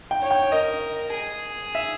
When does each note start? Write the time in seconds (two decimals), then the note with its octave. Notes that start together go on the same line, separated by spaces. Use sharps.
0.11 G5
0.22 C#5
0.31 G5
0.52 A#4 D#5
1.13 G#4
1.75 E5